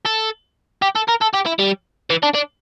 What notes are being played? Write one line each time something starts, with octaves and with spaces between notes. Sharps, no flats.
A4
G4
A4
A#4
A4
G4
E4
G3
E3
D4
D4